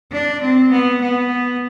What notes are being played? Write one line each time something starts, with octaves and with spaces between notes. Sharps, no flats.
D4
C4
B3
B3